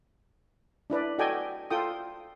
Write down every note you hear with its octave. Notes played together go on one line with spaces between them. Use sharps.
D4 E4 B4 D5
F#4 A4 D5 D#5 G5 G#5
F4 A4 G5 D#6